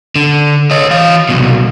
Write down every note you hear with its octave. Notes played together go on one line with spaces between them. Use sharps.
D3
C#5 D#5
E3 F5
C2 B2